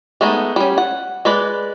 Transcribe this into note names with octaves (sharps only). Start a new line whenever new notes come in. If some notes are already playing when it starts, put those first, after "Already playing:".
G#3 A3 B3 D#4
G3 C#4
F#5
G#3 B4 D5